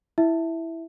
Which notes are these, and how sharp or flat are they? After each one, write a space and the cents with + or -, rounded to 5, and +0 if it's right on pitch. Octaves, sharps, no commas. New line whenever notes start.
E4 +0 E5 -5